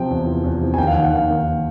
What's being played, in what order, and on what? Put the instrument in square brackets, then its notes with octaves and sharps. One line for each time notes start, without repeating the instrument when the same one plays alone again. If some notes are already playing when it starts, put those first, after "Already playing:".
Already playing: [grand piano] C3 F3 G5
E2
F3
E2
C3
G#5
D#2 G5
F5
F#5
D#3
F#5
D#2 F5
D#2